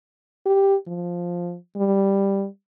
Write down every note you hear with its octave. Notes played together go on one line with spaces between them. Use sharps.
G4
F3
G3